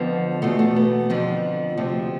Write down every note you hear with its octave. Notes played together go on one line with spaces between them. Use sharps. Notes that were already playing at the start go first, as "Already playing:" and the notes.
Already playing: F2 D3 F3 B3
E2 B2 A3
A3
B3
F2 D3 F3
D2 C3 F3